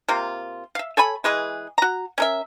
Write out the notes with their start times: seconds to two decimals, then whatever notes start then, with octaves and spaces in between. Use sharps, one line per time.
0.08 C3 A#3 F4
0.75 E5 F5
0.97 A4 C#5 G#5 B5
1.24 E3 G#3 G#4 B4
1.78 F#4 A#5
2.18 C#4 A#4 E5